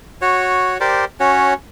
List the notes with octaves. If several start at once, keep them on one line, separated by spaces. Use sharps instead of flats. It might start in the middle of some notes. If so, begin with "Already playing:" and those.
F#4 C#5
G4 A#4 C5 D5
C#4 F#4 C#5